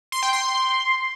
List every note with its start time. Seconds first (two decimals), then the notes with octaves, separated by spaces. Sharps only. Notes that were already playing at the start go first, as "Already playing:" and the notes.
0.12 C6
0.23 G5
0.33 C6